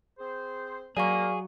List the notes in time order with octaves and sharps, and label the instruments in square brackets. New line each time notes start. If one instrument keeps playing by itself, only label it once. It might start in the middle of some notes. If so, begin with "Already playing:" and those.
[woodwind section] C4 G#4 C5
[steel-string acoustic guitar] F#3 [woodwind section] A#3 [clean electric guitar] G#4 [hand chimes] D5 F5 C#6